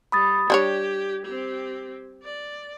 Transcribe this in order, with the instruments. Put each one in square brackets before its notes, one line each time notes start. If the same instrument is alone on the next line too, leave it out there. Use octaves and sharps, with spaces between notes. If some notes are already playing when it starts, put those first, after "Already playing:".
[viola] G3 [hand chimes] B5 D#6 A6
[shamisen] G3 D4 C#5 [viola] G4 [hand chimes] G#6
[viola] C4 G4
D5